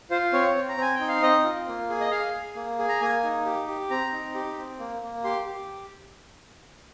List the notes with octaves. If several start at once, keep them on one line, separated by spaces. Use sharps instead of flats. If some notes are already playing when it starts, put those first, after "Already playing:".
F4 C5
C4 C#5
C4
A#5
C4 G#5
G5
D#4
F5
C4 D#5
F4
A#3
G#4
D#5
G#4 F5
G#4
A#3
G#4
A#5
A#3 G#5
D#4
G4
G4
C4 A#5
D#4
G4
C4
A#3
A#3
G4 C6
G4